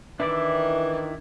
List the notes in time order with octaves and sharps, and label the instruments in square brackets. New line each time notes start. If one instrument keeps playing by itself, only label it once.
[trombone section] D#3 [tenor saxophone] E3 [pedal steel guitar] D4 E4 D5 [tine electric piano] E5